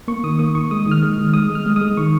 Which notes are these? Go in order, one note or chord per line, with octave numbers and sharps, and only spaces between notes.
A#3 C#6
D#3 D#6
A#3 D#6
D#3 C#6
G#3 D#6
D#3
F6
G#3
D#3 F6
G#3 D#6
G#3
F6
G#3
D#6
G#3
D#3 C#6